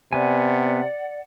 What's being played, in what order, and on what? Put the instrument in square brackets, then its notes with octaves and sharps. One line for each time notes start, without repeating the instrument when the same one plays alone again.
[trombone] C3 [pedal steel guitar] B3 G#5 [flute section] D5 F#5